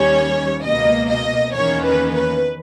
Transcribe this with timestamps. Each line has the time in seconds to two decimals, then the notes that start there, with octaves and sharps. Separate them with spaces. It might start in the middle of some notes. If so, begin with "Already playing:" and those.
Already playing: D#2 D#3 G3 C#4 C#5
0.63 C#2 B2 A#3 D#5
1.09 D#5
1.54 E2 D#3 A#3 C#4 C#5
1.83 B4
2.14 B4